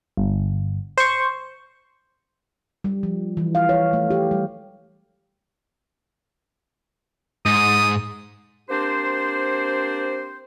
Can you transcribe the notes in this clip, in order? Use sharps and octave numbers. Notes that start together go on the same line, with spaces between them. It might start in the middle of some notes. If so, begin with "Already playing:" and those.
G1
C5 C#6
G3
F3
E3
F5
C#5
A3
G4
G3
G#2 D#6
A#3 C4 D4 G4 C5